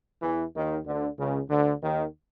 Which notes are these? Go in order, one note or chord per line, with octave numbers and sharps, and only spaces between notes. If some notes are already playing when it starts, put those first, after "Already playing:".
E2 E3
D#2 D#3
D2 D3
C#2 C#3
D2 D3
D#2 D#3